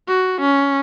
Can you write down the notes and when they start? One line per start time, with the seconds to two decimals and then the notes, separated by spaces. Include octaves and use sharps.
0.08 F#4
0.41 C#4